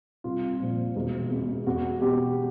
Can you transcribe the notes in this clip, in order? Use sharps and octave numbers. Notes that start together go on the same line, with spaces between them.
C2 F4
A#2 F3
E1
E2 B2
E2 F#4
B2 G4